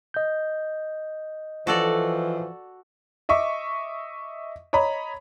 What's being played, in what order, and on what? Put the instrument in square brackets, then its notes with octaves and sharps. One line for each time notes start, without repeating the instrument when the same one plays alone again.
[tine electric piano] D#5 G6
[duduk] E3 [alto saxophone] F3 [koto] F#4 A4 D5
[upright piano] D#5 E5 C#6 D6
C#5 D#5 A#5 B5